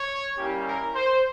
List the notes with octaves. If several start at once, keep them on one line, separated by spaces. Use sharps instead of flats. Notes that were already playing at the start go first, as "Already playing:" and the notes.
Already playing: C#5
G3 A#3 C#4 E4 G4
A#4
C5